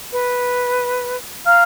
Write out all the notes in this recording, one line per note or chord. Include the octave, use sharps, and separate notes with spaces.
B4
F5 A#5 F6